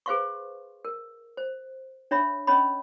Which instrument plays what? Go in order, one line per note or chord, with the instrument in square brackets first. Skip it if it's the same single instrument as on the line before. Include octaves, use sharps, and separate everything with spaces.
[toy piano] G#4 B4 C5 F5 C6 C#6
A#4
C5
D4 C#5 E5 B5
C#4 C#5 D#5 B5